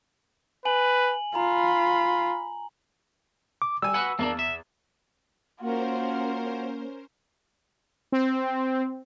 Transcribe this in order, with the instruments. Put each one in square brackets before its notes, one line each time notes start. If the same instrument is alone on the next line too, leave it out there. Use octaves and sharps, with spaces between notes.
[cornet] B4 [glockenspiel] G#5 F#7
[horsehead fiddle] F4 [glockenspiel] A#5 [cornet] B5
[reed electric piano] D6
[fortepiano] G3 G#5 [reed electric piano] E6
[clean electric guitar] F#4 B4 F#5 [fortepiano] G#5
[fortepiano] E2 [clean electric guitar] A#3 C#4 D4
[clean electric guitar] E5
[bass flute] A#3 [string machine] C#4 A#4 C5 [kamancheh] F4 F#4
[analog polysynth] C4